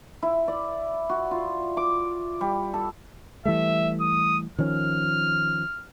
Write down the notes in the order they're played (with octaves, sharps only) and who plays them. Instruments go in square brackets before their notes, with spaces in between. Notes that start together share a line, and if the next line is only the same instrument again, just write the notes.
[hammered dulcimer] E4
D5
F#4
F4
D6
G3
A4
[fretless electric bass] E3 G3 A3 [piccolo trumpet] E5
[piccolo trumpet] D#6
[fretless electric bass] D#3 F3 C#4 [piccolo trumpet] F6